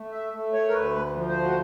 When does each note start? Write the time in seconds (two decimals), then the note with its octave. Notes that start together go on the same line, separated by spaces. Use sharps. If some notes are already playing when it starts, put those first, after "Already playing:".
Already playing: A3
0.12 E5
0.33 A3
0.53 C#5
0.69 A#4
0.73 D2 B4
1.15 F3
1.28 C5
1.43 F#4